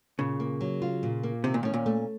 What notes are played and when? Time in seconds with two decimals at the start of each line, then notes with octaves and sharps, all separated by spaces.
0.18 A#2 C#3
0.40 A#3
0.61 F#3
0.82 F4
1.03 A#2
1.23 A#3
1.44 C3 D#3
1.54 A#2
1.63 A2 C#4
1.74 A#2
1.86 A3